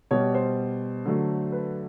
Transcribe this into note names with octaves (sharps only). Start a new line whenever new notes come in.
B2 G3 C#5
C5
D3 F#3 A3
B4